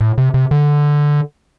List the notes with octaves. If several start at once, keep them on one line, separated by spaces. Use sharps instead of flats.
A2
C3
C3
D3